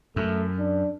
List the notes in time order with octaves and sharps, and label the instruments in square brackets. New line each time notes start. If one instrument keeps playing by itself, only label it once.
[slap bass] F#2 [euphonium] A3
[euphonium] D4